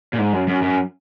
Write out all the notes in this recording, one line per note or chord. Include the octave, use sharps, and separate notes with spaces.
A#2
G#2
F#2
F#2
F#2